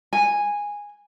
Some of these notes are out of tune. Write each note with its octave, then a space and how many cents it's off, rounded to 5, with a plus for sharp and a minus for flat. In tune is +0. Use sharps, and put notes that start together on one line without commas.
G#5 -10